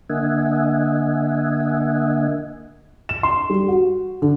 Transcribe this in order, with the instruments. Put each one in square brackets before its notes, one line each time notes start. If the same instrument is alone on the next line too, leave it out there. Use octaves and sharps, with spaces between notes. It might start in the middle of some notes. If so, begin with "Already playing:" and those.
[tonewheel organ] D3 A#3 D#5 E5 F#5 G#5
[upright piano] E7
C6
G3
F#4
D3